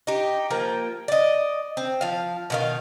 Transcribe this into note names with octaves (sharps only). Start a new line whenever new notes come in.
D#4 G4
F3 A#3 G5
D5 D#5
C4
F3 F5
B2 D#3 F5